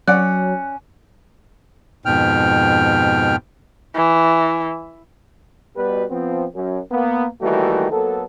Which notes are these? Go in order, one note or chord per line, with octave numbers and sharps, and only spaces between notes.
F#3 C#4 D5 F#5 F#6
F2 G#2 B2 G5 F6
E3
B2 G3 B4
F3 B3 C4
F#2
A#3 B3
D#3 E3 G3 A3 A#3 F#4
F#3 A#3 B3 A4